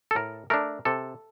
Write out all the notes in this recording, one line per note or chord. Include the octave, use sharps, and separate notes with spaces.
A4
A2 A#4
A3 D4 A#4
C3 A4